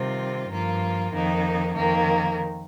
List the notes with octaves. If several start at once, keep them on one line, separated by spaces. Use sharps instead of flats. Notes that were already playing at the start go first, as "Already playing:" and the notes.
Already playing: C3 D#3 G3 C4 F4
G2 F3 A#3 F4
F2 D#3 A#3 D#4
F2 D#3 A#3